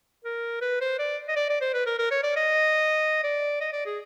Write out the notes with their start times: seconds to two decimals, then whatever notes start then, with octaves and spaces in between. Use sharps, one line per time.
0.24 A#4
0.61 B4
0.81 C5
0.99 D5
1.28 D#5
1.36 D5
1.49 D5
1.61 C5
1.74 B4
1.86 A#4
1.99 A#4
2.11 C#5
2.23 D5
2.36 D#5
3.23 D5
3.61 D#5
3.72 D5
3.86 G#4